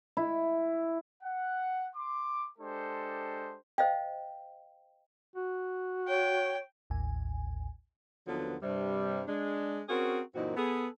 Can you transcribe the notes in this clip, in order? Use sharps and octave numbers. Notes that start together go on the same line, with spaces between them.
E4
F#5
C6 D6
G#3 D4 G4 A4 C5
C5 D#5 F5 G5
F#4
C#5 G5
A1 D#2 A2 G#5
D#2 D3 F3 F#3 B3
G2 C3 G3
G#3 D4
C4 C#4 F#4 G#4 A#4
F#2 A#2 E3 C4 D#4 F#4
B3 G#4 A4